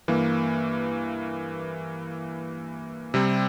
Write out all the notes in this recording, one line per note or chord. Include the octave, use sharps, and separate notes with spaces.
G2 E3 A#3
C3 G3 C4